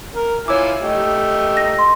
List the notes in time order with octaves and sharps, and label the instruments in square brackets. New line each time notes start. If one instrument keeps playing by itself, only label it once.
[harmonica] A#4
[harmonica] E4 F4 G#5 [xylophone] C#5 D6
[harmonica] A3 D#4 G4
[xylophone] A#6
C6